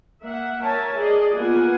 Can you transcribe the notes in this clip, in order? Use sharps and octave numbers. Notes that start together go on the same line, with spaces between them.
A#3 E5 F#5
A#4 C#5 E5 G#5 A5
G#4 D5 D#5
A#3 B3 F4 F#5 G#5